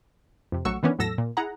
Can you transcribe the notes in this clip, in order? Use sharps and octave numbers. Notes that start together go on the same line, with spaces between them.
F2 C3
A#1 F#3 A3 F#4 C#6 E6
D#3 E3 B3 C#4 D4
E2 A2 F#3 A4 E6 A#6
A#2
E4 G#4 F#5 A#5